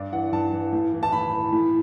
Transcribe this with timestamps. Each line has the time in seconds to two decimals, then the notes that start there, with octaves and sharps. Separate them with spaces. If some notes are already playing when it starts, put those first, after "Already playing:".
Already playing: G2 D5
0.12 E3 F#5
0.33 G2 A5
0.53 E3
0.72 A2
0.93 E3
1.03 A5
1.12 A2 B5
1.33 E3
1.52 A2